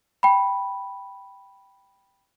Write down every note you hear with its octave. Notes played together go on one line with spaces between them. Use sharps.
G5 B5